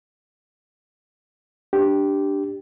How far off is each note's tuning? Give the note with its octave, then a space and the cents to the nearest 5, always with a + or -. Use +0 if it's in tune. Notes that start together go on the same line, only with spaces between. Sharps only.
D4 +0 G4 -5